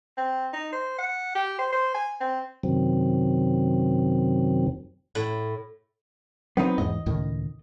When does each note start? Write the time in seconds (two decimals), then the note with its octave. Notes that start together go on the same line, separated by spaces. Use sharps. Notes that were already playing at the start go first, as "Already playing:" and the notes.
0.17 C4
0.53 D#4
0.72 C5
0.98 F#5
1.35 G4
1.59 C5
1.72 C5
1.94 G#5
2.20 C4
2.63 F#2 C3 D#3 F#3 C4
5.15 A2
6.57 F#3 B3 C4 D#4
6.78 E2 G#2 D#5
7.06 C#2 A2 D#3